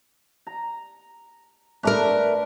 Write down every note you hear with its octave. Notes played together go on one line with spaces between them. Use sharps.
A#5
A3 D4 A#4 B4 E5 A#5